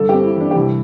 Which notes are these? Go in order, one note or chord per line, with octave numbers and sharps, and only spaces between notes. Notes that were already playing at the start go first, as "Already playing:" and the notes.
Already playing: G1 A4
C4 G4
E4
E3
D4
G4
C2 E4